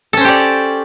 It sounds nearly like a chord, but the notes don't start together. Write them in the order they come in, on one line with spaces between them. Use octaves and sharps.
A4 C#4 C5 G4 D5